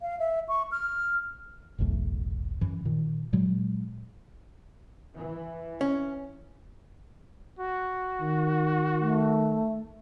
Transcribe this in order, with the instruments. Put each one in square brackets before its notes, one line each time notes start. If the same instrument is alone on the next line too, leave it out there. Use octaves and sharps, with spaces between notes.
[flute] F5
E5
C#6
F6
[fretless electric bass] F#1 B1 E2 A2
F#2 E3
A#2 D#3
A#2 F#3 G#3
[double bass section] E3
[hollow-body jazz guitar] C#4
[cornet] F#4
[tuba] D#3
[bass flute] A3